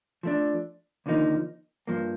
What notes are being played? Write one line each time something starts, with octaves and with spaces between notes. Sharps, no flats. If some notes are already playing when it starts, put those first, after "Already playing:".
F3 A3 D4
D#2 D3 F3 A#3 D#4
G2 F3 A#3